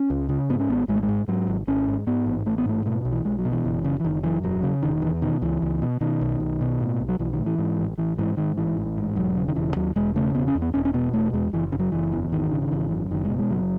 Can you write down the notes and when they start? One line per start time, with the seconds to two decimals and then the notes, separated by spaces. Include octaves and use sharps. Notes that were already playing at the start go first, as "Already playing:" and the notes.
Already playing: C#4
0.10 C#2
0.29 C#3
0.49 G#2 B3
0.60 C#4
0.68 G#1 B3
0.88 G#1 G#3
0.95 A3
1.03 G#3
1.08 G#2
1.28 G#2 F#3
1.48 G#1
1.67 G#1 C#4
1.88 G#2
2.07 G#2 B3
2.26 A1
2.46 A1 A3
2.58 B3
2.66 G#2 A3
2.86 B2 A3
3.05 B1
3.12 E3
3.25 B1 G#3
3.39 F#3
3.45 B2
3.52 E3
3.64 F#1 E3
3.84 C#3
4.00 E3
4.05 F#1 D#3
4.23 F#2 E3
4.43 E1 F#3
4.63 C#3
4.82 E1 D#3
5.02 E2
5.22 B2 D#3
5.42 C#2 E3
5.62 C#2
5.82 B2
6.01 B2 D#3
6.21 B1
6.40 B1
6.61 B2
6.80 A2
7.00 B1
7.09 F#3
7.19 B1 E3
7.33 D#3
7.39 A2
7.46 E3
7.59 G#2
7.79 A1
7.98 A1 E3
8.18 G#2 E3
8.37 G#2 D#3
8.57 A1 E3
8.77 A1
8.97 G#2
9.16 E1 F#3
9.37 C#3
9.48 D#3
9.55 E1 E3
9.76 D#2 F#3
9.96 E1 G#3
10.16 C#3 A3
10.35 E1 B3
10.47 C#4
10.55 E2
10.62 B3
10.74 E1 C#4
10.85 C#4
10.94 B2 B3
11.13 E1 A3
11.33 E2 G#3
11.53 F#1 E3
11.72 C#3
11.79 F#3
11.92 F#1 E3
12.12 E2
12.32 G#1 D#3
12.51 C#3
12.62 D#3
12.72 G#1 E3
12.91 F#2
13.11 F#1 D#3
13.25 G#3
13.30 B2
13.39 G#3
13.51 F#1 F#3